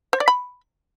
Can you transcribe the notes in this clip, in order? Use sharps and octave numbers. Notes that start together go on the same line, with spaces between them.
C5
D5
B5